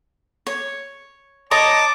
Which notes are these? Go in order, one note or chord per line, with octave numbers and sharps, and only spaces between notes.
C#5
C#5 D#5 A5 A#5 D6